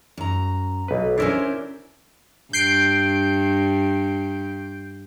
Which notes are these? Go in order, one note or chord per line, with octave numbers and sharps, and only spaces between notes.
F#2 A#5
B1 B4
C#4 D4 E4 A#4 C5 C#5
G2 G6 C7 D7